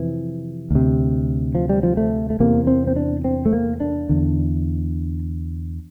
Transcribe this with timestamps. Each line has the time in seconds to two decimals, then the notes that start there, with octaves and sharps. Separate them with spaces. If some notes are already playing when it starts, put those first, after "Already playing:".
Already playing: F2 C3 E3
0.71 D2 C3
1.55 F3
1.69 G3
1.83 F3
1.97 A3
2.30 A3
2.40 E2 C3 A#3
2.67 C4
2.87 C4
2.96 D4
3.24 C4
3.46 A3
3.53 A#3
3.80 D4
4.09 E2 D3